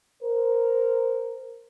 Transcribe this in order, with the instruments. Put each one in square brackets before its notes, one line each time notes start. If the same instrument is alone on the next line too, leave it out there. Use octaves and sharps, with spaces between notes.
[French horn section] A#4 C5